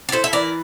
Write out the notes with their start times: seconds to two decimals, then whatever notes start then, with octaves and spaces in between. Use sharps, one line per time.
0.09 D5
0.12 E4 A4 C5
0.24 E5
0.33 E3 A#4 D5